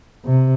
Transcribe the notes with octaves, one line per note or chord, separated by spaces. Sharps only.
C3